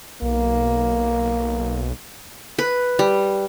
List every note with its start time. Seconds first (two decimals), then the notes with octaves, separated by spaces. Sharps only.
0.22 B1 A#3
2.59 B4
2.99 G3